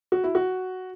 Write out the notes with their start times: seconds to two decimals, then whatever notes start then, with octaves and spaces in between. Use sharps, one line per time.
0.12 F#4
0.24 E4
0.35 F#4